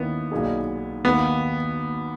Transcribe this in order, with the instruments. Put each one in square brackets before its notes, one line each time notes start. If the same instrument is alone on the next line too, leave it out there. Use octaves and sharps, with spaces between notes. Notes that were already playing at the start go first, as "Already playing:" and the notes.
Already playing: [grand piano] D#2 D#3 A#3 C#4 E4 [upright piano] B3
[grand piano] B1 A#2 A#3 D#4 G#4
[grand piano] D#2 D#3 A#3 [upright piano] B3